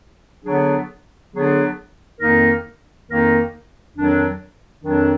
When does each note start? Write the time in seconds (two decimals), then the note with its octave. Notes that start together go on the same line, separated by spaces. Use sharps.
0.45 D3 F#3 B3 D4 G#4
1.33 D3 F#3 B3 D4 G#4
2.20 F2 D#3 A#3 D#4 A#4
3.07 F2 D#3 A#3 D#4 A#4
3.95 F2 D#3 F#3 D4
4.82 F2 D#3 F#3 D4